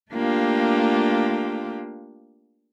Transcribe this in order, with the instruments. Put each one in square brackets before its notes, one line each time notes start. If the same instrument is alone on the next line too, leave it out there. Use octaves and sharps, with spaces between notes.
[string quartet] A3 A#3 D4 F4 G4